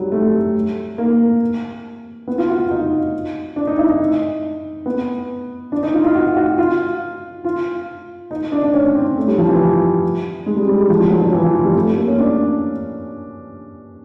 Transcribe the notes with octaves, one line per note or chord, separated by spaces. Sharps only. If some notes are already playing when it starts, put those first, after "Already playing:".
Already playing: F#3 G3
A3
A#3
B3
F4
F#4
F4
D#4
D4
D#4
E4
D#4
B3
D4
D#4
F4
F4
F#4
F#4
F4
F4
D#4
D4
D4
C#4
C4
A3
G3
F3
E3
G#3
G3
G3
G#3
F3
F3
F#3
F#3
E3
F3
G3
A3
A#3
C#4
D4